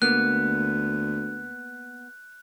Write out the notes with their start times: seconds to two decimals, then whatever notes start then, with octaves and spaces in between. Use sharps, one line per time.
0.02 D2 A#3 B3 F#6